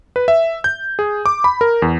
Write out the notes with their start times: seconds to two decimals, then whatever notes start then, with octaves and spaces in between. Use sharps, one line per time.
0.16 B4
0.28 E5
0.64 G6
0.99 G#4
1.26 D6
1.44 B5
1.61 A#4
1.82 E2